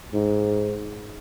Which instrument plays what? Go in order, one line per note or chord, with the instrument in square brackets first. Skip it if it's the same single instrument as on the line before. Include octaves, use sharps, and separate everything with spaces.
[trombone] G#2